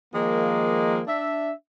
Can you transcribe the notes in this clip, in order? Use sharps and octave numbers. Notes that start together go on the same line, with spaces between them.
D#3 F3 G#3 A#3
D4 E5